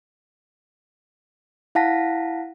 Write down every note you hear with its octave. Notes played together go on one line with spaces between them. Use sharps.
E4 F5 F#5 A5 A#6 B6